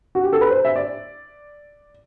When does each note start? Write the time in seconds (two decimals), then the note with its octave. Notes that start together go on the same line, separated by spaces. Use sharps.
0.15 F#4
0.24 G4
0.33 A4
0.41 B4
0.50 C5
0.65 E5
0.76 D5